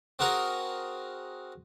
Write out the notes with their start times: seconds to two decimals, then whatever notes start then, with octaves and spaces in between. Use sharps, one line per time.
0.19 C4 F#4 G#4 A#4